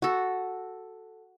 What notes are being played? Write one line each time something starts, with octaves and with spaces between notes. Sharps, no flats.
F#4 A4